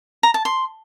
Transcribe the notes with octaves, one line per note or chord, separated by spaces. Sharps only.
A#5
A5
C6